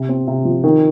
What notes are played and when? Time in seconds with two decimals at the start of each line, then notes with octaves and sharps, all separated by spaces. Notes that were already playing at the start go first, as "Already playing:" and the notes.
Already playing: C3
0.09 C4
0.27 C3
0.45 F3
0.64 D#3